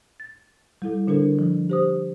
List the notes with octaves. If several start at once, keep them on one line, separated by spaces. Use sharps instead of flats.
A6
G3 E4 A4
D3 D4 A4 A#4
F3
G4 C5 D#6